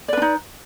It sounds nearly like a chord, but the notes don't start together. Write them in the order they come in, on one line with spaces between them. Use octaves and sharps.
D5 B4 D4 D#4